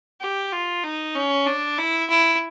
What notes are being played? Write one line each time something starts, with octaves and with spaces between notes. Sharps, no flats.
G4
F4
D#4
C#4
D4
E4
E4